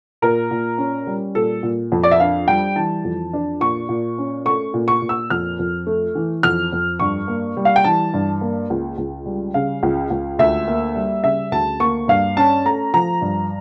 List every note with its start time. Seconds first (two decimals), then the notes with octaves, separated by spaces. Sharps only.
0.22 A#2 A#4
0.51 A#2
0.78 C#4
1.07 G3
1.35 A#2 A4
1.63 A#2
1.92 F2
2.03 D5
2.11 E5
2.20 D4 F5
2.48 G3 G5
2.76 E3 A5
3.04 F2
3.33 D4
3.61 A#2 C#6
3.89 A#2
4.18 C#4
4.46 A3 C#6
4.74 A#2
4.88 C#6
5.02 A#2
5.09 E6
5.30 F2 F6
5.59 F2
5.87 A3
6.15 E3
6.43 F2 F6
6.72 F2
7.00 G2 C#6
7.28 A#3
7.57 G3
7.65 F5
7.76 G5
7.84 E3 A5
8.14 G2
8.41 A#3
8.70 C#2
8.98 C#2
9.26 G3
9.54 C#3 F5
9.83 C#2
10.10 C#2
10.39 D2 E5
10.68 A#3
10.95 G3
11.24 C#3 E5
11.52 D2 A5
11.80 A#3 C#6
12.08 G2 F5
12.37 C#4 A5
12.65 A3 A#5
12.94 F3 A#5
13.22 G2